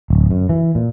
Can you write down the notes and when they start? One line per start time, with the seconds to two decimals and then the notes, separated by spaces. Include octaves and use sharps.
0.10 D1
0.31 F#2
0.49 E3
0.75 A#2